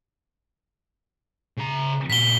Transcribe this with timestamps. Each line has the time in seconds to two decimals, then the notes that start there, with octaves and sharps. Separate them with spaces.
1.57 C#3 A#5
2.10 A#2 F#4 B6 G7